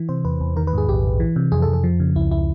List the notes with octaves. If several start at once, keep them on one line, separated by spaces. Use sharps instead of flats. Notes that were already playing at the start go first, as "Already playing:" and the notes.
Already playing: E3
C3 C5
E2 B4
E2
D#3 A#4
B4
G#2 G#4
A#1 G4
A#1
E3
C3
F2 G#4
A4
F2
A4
F3
C#3
C#2 E4
E4